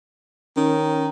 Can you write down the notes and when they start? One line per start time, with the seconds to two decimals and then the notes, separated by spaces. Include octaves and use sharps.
0.57 D#3 C#4